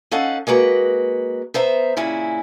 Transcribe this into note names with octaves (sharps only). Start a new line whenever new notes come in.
C#4 D#4 A4 F5 F#5
G#3 A#3 F#4 B4
B3 C5 E5 A#5
A#2 C#3 C#4 E4